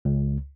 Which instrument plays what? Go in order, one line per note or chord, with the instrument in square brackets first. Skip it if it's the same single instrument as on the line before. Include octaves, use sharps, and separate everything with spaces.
[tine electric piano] C#2